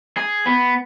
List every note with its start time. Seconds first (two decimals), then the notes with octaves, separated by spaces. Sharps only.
0.17 G#4
0.46 B3